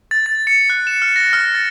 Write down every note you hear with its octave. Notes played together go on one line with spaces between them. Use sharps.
A6
A6
C#7
F#6
E7
F6
A#6
F6
A6